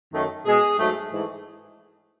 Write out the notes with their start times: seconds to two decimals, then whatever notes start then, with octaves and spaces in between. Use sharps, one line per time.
0.13 F#2 D#3 A3
0.46 B2 G#3 G#4
0.79 G#2 F#3 A3
1.10 G#2 E3 A3